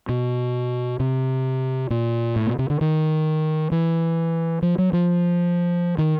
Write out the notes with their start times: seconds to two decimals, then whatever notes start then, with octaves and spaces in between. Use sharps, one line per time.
0.09 B2
1.00 C3
1.90 A#2
2.36 A2
2.46 B2
2.59 C3
2.70 D3
2.81 D#3
3.72 E3
4.62 F3
4.78 F#3
4.93 F3
5.98 D#3